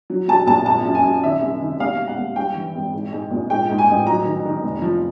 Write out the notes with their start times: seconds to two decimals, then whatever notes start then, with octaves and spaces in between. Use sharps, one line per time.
0.10 F#3
0.28 F#3 A5
0.47 A#1 A5
0.66 G#1 A5
0.85 F#2
0.95 G#5
1.04 F#2
1.24 D#3 E5
1.41 C2
1.61 D#3
1.80 D#2 F5
1.99 E1
2.07 F#5
2.18 D#2
2.36 G2 G5
2.55 E3
2.75 G#1
2.93 G#2
3.13 G#2
3.31 A#1
3.50 G#2 G5
3.69 G#2
3.78 G#5
3.88 A1
4.07 F#3 A#5
4.25 D#3
4.45 D#3
4.63 F1
4.82 F3